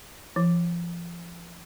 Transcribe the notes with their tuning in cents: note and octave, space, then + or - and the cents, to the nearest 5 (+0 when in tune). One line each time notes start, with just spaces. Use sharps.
F3 -30